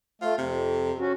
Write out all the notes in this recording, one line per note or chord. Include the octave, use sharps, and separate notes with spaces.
A3 F4
F2 C3
C#4 F#4